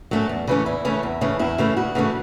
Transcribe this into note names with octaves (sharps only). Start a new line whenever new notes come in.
F#3 A3 C#4
E2
C#3 E3 A3 C#4
E2 E4
C#3 E3 A3 C#4
E2
C#3 E3 A3 C#4
E2 E4
C#3 E3 A3 C#4
D2 F#4
C#3 E3 A3 C#4